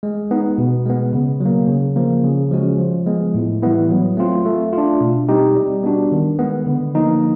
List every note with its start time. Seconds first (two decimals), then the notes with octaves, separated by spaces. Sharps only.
0.03 G#3
0.31 B3 D#4
0.58 B2
0.86 G#3 B3
1.13 C#3
1.40 F#3
1.45 A#3
1.68 C#3
1.96 F3 A#3
2.24 C#3
2.51 F3 G#3 C#4 F#4
2.79 F3
3.06 G#3 B3
3.35 A2
3.62 E3 G3 B3 E4
3.90 F#3
4.17 A3 C4 F4
4.46 A3
4.73 F4
4.78 D4
5.01 B2
5.29 G3 C4 D#4 G4
5.55 G3
5.83 B3 D4 F#4
6.12 D#3
6.39 G#3 B3
6.66 D3
6.95 F3 A#3 D#4